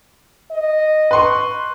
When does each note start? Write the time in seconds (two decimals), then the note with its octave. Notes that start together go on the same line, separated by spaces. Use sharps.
0.51 D#5
1.11 B4 C6 C#6